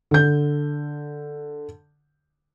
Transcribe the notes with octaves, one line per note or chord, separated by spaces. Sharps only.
D3 G6